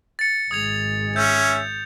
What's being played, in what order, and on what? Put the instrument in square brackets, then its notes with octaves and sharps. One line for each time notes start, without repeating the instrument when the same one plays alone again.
[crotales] A6 C#7
[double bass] G#1 G#3 [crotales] D#6 G#6 F7
[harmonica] C#4 E5 [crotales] G6